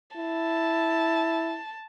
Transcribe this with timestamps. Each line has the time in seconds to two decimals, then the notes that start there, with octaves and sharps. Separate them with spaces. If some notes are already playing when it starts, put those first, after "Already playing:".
0.17 E4 A5